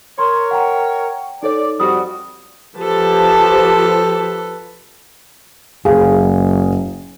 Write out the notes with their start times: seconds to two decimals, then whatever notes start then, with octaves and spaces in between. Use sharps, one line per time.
0.19 A#4 C#5 C6
0.51 F#5 G5 A#5
1.43 D#4 A4 C#5 D5
1.80 F2 G3 F#4 D#6
2.79 F3 G4 A4 B4 A5
5.85 F#1 G#4 F5